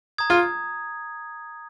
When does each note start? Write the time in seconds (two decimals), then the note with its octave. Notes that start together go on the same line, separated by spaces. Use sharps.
0.18 A#5 D#6 G#6
0.30 F4